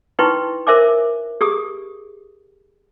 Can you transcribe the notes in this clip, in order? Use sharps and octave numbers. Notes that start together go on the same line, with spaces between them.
D#4 E4 B4 G5 C6 C#6
A#4 C5 E5 G#5 D6
G4 G#4 D#6